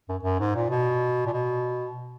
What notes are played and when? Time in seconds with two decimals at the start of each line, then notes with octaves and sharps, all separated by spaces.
0.09 F#2
0.23 F#2
0.40 G#2
0.55 A#2
0.70 B2
1.27 A#2
1.33 B2